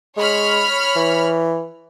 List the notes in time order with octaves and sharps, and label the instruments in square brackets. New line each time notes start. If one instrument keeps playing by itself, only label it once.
[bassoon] G#3 [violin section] C#5 B5 F6
[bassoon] E3